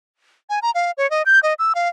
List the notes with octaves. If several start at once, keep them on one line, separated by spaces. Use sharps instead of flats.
G#5
A#5
F5
C#5
D#5
G6
D#5
E6
F5